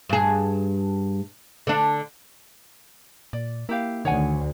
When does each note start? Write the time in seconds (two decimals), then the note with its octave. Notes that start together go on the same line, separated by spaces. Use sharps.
0.09 G2 G#4
1.67 D3 D4
3.33 A#2 D5
3.69 A#3 E4 G4 F5
4.05 D2 D#3 C#5 F#5 G#5